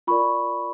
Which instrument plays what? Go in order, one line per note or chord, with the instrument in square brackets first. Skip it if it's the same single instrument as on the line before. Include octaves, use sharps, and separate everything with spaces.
[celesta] F4 A#4 D5 B5 C#6